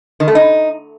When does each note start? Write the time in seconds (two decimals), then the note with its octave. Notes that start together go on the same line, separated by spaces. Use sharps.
0.20 D#3
0.28 A3
0.35 D#4